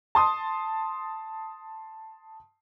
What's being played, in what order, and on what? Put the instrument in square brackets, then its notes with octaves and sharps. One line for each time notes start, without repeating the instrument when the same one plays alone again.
[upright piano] A5 C6 D#6